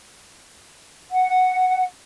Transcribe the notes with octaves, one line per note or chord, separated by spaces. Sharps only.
F#5